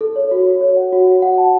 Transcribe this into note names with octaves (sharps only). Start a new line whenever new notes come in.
A4
C#5
F#4
F#4
C#5
F#5
F#4
F#4
F#5
A5